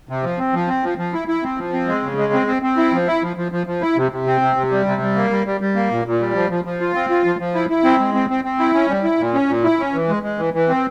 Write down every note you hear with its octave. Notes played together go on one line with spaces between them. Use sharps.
C3
F3
C4
F3
C4
F3
F3
E4
E4
C4
F3
C4
G#3
C#3
G#3
C4
C4
C4
E4
F3
E4
F3
F3
F3
F3
E4
C3
C3
C4
C3
C3
G3
C3
G3
A#3
G3
G3
G3
A#3
A#2
A#2
G3
F3
F3
F3
F4
C4
F4
F3
F3
E4
E4
C4
G#3
C4
C4
C4
E4
C#4
G3
E4
A#2
C#4
A#2
E4
C#4
E3
G#3
G#3
E3
E3
C4